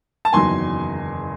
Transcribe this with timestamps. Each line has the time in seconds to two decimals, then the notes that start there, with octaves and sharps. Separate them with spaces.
0.25 A5
0.33 F#1 E2 D#3 F#3 G#5 C6